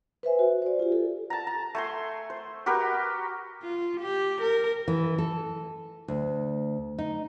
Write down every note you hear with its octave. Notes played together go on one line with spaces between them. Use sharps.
B4 C5 E5 G#5
F#4
C5 D5
F4 G4
A4
A5 A#5
A#5
A3 G#5 C6
C5
F#4 G4 A#4 B4
F4
G4
A#4
E3
A4
D2
D#4